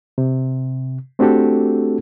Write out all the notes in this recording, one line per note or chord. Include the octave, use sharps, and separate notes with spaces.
C3
A3 C4 D4 F#4 G4 A4